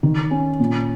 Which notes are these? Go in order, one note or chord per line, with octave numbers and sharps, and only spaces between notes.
D#3
C#4
A#2